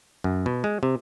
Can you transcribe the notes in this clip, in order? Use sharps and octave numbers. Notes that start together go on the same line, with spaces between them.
F#2
B2
G#3
C3